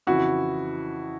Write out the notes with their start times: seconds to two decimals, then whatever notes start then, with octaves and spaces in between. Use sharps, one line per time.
0.07 F2 C#3 E3 E4 F#4